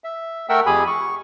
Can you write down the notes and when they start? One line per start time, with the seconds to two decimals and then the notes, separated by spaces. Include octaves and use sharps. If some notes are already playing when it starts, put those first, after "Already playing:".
0.04 E5
0.49 A3 A#4 E5 F#5 G5 E6
0.66 F2 G4 G#4 G#5 B5
0.87 C#6